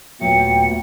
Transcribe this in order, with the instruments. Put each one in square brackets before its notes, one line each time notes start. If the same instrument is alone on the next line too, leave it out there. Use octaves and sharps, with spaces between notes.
[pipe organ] D#2 A#2 A3 [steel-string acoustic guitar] F#3 B3 [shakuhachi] G5 [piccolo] C#7